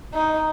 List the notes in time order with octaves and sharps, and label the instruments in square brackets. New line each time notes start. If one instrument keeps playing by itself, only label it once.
[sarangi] D#4